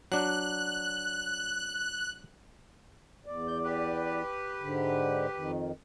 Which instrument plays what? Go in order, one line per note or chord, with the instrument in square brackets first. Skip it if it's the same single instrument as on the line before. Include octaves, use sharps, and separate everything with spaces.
[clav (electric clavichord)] F#3 D4 [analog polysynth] F#6
[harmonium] E2 D5
[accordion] G6
G4 B4
[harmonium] G#2 D3
F2 D#3